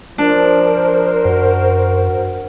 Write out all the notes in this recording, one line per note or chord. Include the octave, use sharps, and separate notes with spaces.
F3 D4 A#4 C5
F#2 F#4